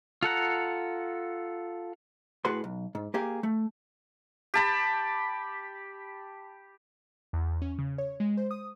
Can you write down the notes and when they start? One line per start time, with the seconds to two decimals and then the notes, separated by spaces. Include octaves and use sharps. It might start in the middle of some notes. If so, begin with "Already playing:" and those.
0.23 F4 A4 F#5 A#5
2.45 A2 F#4 G#4 B4 C6
2.64 B1
2.95 G#2
3.14 A#3 G4 G#4 F5
3.43 A3
4.54 G4 A5 B5
7.33 E2
7.62 C#4
7.78 C#3
7.98 C#5
8.20 G#3
8.37 C5
8.51 D#6